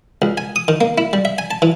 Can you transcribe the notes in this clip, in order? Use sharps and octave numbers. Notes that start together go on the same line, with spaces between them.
C#2
G#5
D#6
D#3
A#3
E4
G3
E5
G#5
A5
E3